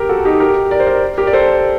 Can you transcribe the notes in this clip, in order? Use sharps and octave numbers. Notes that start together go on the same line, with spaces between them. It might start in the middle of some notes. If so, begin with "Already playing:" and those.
Already playing: G4 A#4
F#4 A4
D#4 G4
G4 A#4
A#4 D5
C5
A#4 D5
G4 A#4
D5
A4 C5